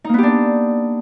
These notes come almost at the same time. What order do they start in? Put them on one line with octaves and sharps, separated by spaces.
D#4 A#3 B3 G4 D4